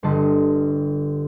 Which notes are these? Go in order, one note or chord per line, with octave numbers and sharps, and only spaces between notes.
G1 D3 G3 D#5 A5 C6